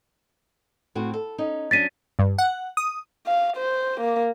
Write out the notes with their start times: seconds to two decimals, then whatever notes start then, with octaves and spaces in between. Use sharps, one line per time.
0.95 A2 C4 F#4
1.14 A4
1.38 C#4 D#4
1.71 F#3 C#4 D4 A6 B6 D#7
2.19 G2
2.38 F#5
2.77 D#6
3.26 F5
3.57 C5
4.01 A#3